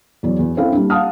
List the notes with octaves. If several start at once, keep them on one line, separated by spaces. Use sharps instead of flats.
E2 F#3 D5
E2
C4 C#4 E4 A4 F5
G3 A#3 D4
F5 F#5 A5 D#6 F6